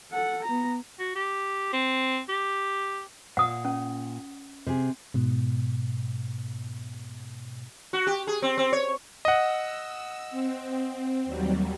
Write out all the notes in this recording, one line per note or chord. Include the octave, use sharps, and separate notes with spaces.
A4 F#5
B3 A#5
F#4
G4
C4
G4
A#2 F#5 D#6
C#4
C3 G#4
G#2 B2
F#4
G4
G#4
C4
C4
C#5
D#5 F#5 E6
C4
D#2 F#3 G3